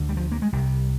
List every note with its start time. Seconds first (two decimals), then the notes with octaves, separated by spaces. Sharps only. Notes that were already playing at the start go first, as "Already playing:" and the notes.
Already playing: D2 D3
0.09 G3
0.17 F3
0.32 A#3
0.42 G#3
0.52 C2 C3 G3